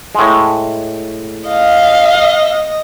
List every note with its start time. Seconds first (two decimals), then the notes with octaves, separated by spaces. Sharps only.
0.15 A2 G#3
1.48 D#5 F5